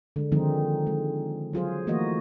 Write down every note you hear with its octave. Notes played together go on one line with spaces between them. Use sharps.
D3 G#3
D3 D#3 F3 G#3 C4 D#4
G#3
F#3 F4 G#4 C5
E3 A3 A#3 F#4 A#4 D#5